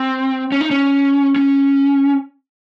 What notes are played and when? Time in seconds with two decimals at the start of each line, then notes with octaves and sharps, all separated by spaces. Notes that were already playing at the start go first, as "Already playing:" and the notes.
Already playing: C4
0.52 C#4
0.61 D#4
0.71 C#4
1.36 C#4